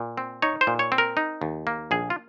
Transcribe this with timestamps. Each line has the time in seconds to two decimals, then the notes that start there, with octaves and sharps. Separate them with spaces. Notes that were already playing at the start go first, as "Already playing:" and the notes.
Already playing: A#2
0.17 C4
0.42 D#4 C#5
0.61 C5
0.67 A#2
0.79 C#5
0.92 C4
0.98 A#4
1.17 D#4
1.42 D#2
1.67 A#3
1.91 A#1 G#4
2.10 F4